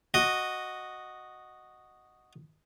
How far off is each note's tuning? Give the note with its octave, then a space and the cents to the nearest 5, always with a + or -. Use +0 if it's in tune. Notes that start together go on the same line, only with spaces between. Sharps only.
F#4 +0 D#5 -5